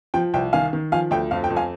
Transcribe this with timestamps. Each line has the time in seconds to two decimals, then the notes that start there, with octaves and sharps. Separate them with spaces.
0.14 F3 G5
0.34 C2 G5
0.53 D#3 F5 G#5
0.73 D#3
0.92 F3 F5 G#5
1.11 D2 G5
1.31 F2 F5
1.44 G5
1.50 F2
1.56 F5 G#5